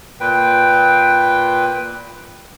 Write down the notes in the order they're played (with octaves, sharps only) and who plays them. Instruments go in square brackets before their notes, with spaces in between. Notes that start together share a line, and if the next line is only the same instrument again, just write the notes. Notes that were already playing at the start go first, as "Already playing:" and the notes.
[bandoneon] A#2 B4 G5